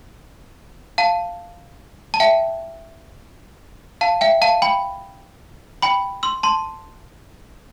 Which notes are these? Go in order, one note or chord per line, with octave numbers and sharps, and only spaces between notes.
F5 A5
A5
E5 G5
F5 A5
E5 G5
F5 A5
G5 B5
G5 B5
C6 E6
A5 C6